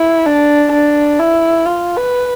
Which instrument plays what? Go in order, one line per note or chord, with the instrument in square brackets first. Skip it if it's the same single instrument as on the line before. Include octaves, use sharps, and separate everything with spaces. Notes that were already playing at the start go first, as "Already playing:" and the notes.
Already playing: [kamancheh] E4
D4
D4
E4
F4
B4